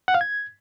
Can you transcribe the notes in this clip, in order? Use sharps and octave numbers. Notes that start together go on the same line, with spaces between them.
F#5
F5
G#6